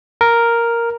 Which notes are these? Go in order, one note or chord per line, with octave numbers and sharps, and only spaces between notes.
A#4